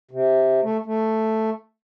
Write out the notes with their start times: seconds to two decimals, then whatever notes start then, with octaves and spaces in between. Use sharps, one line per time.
0.11 C3
0.63 A3
0.86 A3